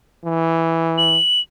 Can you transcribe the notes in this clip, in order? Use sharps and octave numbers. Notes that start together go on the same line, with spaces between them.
E3
F#7